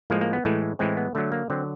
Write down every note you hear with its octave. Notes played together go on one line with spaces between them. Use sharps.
A2 F3 G#3 A#3
A#3
B3
A2 E3 G#3 A3
A2 E3 G#3 C4
B3
D3 F#3 A3
A#3
D3 F#3 C4